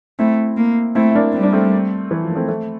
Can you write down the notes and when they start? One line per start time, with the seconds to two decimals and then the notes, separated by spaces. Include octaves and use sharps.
0.19 A3 C4 E4
0.57 A#3
0.95 A3 C4 E4
1.11 E4
1.15 A#3 D4
1.34 G3 C4
1.43 D4
1.53 A3 C4
2.11 E3
2.23 F3
2.29 A#3
2.35 A3 C4
2.48 A3 C4